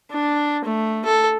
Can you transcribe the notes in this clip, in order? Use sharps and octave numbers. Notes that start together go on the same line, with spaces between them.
D4
A3
A4